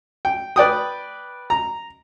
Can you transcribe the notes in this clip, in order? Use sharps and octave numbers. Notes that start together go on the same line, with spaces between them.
G5
B4 D5 G5 D#6
A#5